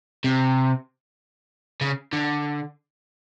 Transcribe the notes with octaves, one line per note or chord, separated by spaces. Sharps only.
C3
C#3
D3